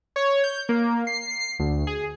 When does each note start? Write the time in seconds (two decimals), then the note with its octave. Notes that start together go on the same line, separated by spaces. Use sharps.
0.16 C#5
0.44 G6
0.69 A#3
1.07 C7
1.59 D2
1.87 G#4